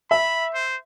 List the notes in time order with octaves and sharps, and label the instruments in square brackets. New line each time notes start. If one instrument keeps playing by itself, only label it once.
[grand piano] E5 [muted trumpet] B5
[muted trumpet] C5